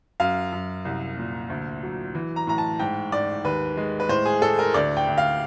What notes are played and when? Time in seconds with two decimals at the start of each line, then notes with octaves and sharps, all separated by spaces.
0.20 F#2 F5
0.52 F#2
0.85 C2
1.17 A#2
1.50 D2
1.82 F#3
2.15 E3
2.36 A#5
2.47 A2 A#5
2.58 A5
2.80 G#2 G5
3.12 G#2 D5
3.44 D#2 B4
3.77 G#3
4.00 B4
4.09 A2 C5
4.25 G#4
4.42 A2 A4
4.59 A#4
4.74 D2 D5
4.97 G5
5.07 D2
5.18 F5